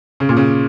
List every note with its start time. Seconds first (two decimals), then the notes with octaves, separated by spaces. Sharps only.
0.20 C#3
0.29 A#2
0.37 C#3